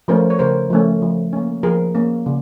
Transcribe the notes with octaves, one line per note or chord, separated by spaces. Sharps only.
F3 A3 C#4 A#4 C5
C#5
C#3 A#4 C5
F3 A3 C#4
F3
A#3 C#4
F3 G#4 A#4
A#3 C#4
C#3